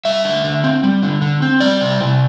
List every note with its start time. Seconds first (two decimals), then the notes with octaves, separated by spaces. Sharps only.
0.05 G3 E5
0.25 D3
0.44 D3
0.64 C4
0.84 G3
1.03 D3
1.22 D3
1.42 C4
1.60 G3 D5
1.81 C3
2.01 C3